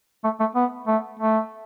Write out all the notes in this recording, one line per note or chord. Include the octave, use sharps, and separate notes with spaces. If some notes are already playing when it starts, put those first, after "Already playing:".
A3
A3
B3
A3
A3